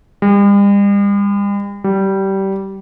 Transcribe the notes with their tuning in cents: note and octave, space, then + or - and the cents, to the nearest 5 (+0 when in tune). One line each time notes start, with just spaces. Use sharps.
G3 +45
G3 -20